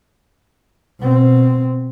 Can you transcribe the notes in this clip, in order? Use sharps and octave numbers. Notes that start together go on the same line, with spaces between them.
B2 C4